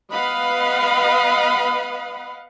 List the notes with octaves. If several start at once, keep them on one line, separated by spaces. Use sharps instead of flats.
B3 B4 D#5 F5 F#5 B5